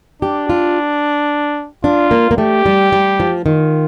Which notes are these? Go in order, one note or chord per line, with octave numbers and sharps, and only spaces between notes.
D4 G4
F4
D4 F4
A#3
A#3
A3 G4
G3
G3
F3
D#3 F4